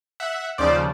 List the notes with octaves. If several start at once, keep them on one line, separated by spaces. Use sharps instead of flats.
E5 F#5
D#2 C#3 F3 C5 D5